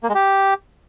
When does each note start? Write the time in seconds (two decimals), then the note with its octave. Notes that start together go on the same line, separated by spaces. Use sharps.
0.03 A#3
0.09 G#3
0.15 G4